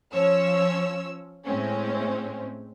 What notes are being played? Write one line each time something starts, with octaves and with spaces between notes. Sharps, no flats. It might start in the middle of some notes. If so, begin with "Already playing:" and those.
F3 C#4 C#5 E6
A2 G#3 C4 C#4